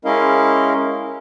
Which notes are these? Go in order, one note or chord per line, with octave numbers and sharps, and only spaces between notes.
G#3 C#4 E4 A#4 D#5 F5